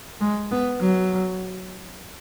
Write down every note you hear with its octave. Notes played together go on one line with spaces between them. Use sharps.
G#3
B3
F#3